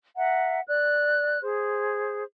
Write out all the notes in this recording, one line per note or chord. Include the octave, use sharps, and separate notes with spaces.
E5 F#5 A#5
D5 F#6
G#4 C5